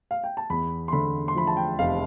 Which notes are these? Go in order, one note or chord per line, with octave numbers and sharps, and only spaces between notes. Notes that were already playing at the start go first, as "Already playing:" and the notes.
F5
G5
A5
E2 B5
C6
D3 B5
C6
F3 B5
A5
G5
F1 F5